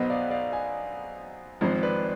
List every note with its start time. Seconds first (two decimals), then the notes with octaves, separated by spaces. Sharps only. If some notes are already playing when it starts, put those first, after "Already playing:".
Already playing: B1 B2 B3 C5 D#5
0.10 D5 F5
0.30 D5 F5
0.52 F5 G#5
1.61 G#1 G#2 F3 C4 C5
1.83 B4 D5